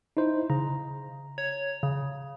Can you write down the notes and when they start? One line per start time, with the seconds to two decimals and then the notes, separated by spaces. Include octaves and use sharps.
0.17 D#4 E4 C5
0.50 C#3 A#5
1.38 C#5
1.83 C#3